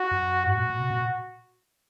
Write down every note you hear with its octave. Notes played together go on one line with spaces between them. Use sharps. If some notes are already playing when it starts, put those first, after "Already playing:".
Already playing: F#4
F#2
G#2 F#4
A#2
A#2
C3
A#2